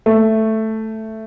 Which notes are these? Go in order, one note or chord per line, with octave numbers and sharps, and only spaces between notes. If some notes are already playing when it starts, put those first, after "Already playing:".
A3